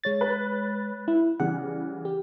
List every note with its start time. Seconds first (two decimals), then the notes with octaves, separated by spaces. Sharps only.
0.04 G#3 C#5 A6
0.21 B4
1.08 E4
1.40 C#3 E3 G3 F#5
2.05 G4